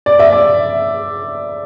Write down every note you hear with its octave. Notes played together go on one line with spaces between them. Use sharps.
D5
E5
D5